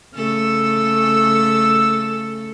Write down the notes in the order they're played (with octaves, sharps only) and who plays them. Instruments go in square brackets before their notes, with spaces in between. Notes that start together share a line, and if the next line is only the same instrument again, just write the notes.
[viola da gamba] C#3 A3 A4 [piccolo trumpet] E6